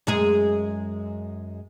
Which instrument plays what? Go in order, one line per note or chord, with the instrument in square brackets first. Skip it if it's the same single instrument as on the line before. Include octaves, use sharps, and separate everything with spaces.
[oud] F#2 G#3 G#4